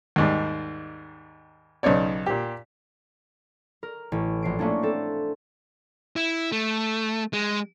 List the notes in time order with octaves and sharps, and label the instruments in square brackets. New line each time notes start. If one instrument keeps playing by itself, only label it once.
[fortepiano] D#2 G#2 G3
B1 C#3 D#4 C#5 D5
A#2 G4
[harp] A#4
A1
A#1 C7 D7
A3 A#3 C#4 D4
C4 A4
[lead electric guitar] E4
A3
G#3